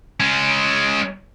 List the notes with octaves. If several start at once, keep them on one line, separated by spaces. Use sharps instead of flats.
G#3 C#4